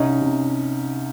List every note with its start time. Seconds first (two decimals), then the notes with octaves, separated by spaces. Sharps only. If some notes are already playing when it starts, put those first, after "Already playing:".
Already playing: C2 C#4 D#4
0.21 C3